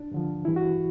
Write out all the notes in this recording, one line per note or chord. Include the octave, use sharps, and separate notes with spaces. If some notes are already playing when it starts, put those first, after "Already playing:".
Already playing: D4
G2 D3 F3
G2 E3 E4
F#4